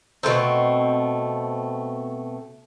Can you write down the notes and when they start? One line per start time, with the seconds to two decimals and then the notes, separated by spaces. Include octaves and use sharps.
0.23 B2 G#3 A3 C4